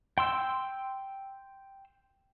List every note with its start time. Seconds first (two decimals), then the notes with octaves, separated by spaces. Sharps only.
0.18 G5 C6 E6